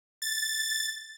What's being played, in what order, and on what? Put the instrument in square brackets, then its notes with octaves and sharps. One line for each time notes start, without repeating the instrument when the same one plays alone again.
[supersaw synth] A6